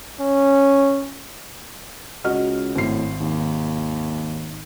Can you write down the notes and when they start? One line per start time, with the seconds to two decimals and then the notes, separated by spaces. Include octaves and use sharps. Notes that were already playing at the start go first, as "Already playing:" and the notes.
0.20 C#4
2.24 C#2 F#4 D#5 F6
2.76 G#1 A2 C7
3.20 D#2